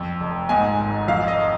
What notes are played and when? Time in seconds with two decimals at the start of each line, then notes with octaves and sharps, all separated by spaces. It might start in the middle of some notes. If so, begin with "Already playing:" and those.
Already playing: F2
0.20 F1
0.49 G#2 G#5
0.79 G#1
1.08 F2 F5
1.28 D#5